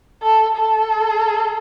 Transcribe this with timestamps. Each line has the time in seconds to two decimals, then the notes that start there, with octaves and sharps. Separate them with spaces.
0.22 A4
0.56 A4